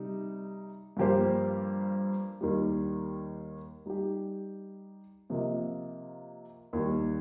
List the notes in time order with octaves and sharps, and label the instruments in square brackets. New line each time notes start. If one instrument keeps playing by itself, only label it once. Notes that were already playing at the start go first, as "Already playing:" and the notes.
Already playing: [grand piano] C3 G3 D#4
G2 F3 A#3 G4 C5
D#2 D#3 G3
G3 D#4 G4
C3 F3 A#3 F4 D#5
D#2 D#3 G3